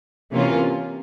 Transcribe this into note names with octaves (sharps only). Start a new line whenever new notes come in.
C3 E3 A#3 C#4 F4